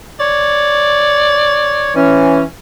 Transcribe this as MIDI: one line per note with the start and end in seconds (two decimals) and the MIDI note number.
0.20 1.94 73
0.20 1.97 74
1.96 2.42 52
1.96 2.42 61